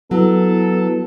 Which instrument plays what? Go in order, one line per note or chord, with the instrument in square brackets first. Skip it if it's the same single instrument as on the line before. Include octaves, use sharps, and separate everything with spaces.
[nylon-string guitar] F#3 [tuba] B3 [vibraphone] E4 B4 [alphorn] A4